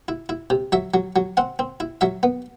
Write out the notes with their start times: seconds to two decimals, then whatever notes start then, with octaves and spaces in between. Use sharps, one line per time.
0.08 E4
0.29 E4
0.50 C3
0.72 F#3 E5
0.94 F#3
1.16 F#3
1.37 C4 F#5
1.59 C4
1.80 E4
2.01 F#3 E5
2.23 B3